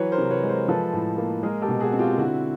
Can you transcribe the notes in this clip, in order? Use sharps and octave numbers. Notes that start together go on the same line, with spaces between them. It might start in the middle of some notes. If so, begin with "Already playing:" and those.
Already playing: E3 F#3 B4 C#5
A#4 C5
C3
B4 C#5
G#3
A#4 C5
F3 A4 B4
A2
A#3
G#3 G#4 A#4
G4 A4
B2
F#4 G#4
C4
F4 G4
D3 E4 F#4